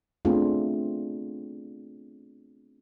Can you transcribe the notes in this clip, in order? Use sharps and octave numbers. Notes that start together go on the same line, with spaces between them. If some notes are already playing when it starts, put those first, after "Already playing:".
A3 B3 C4 D4 F4 G#4